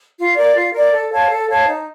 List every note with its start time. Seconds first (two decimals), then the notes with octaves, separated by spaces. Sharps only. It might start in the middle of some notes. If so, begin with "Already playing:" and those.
0.17 F4
0.36 A#4 D5
0.55 F4
0.73 A#4 D5
0.92 A4
1.11 C#5 F5 A5
1.30 A4
1.49 C#5 F5 A5
1.66 D#4